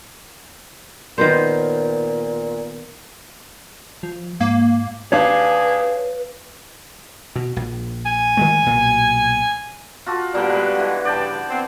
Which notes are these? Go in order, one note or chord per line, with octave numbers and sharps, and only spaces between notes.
A#2 D#3 B3 C5
F3
G#2 A#3
D#2 D4 G#4 B4 C#5 F5
B2
A#1
G#5
D#3 G#3 A3
B1 A#2
F4 F#4 A4
A#2 D3 G3 B3 D4
G#3 B4
D3 E3
G2 C#3 D5 G5 A5
B3 C4